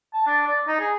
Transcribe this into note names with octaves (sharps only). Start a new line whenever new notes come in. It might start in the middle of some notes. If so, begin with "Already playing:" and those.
A5
D4
D5
D#4
G#4